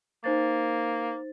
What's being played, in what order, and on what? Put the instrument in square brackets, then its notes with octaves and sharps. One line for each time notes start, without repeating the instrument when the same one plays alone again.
[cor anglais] A#3 [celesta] D#4 C5 A6